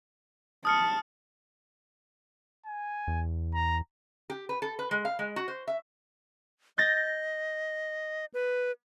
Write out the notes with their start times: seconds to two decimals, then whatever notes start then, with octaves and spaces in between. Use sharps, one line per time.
0.65 A5 D#6 F6 C#7
2.66 G#5
3.08 E2
3.54 A#5
4.30 G4
4.49 B4
4.62 A4
4.79 B4
4.91 G#3
5.05 F5
5.19 G#3
5.36 F#4
5.48 C5
5.67 E5
6.78 D#5 G6 A6 A#6
8.34 B4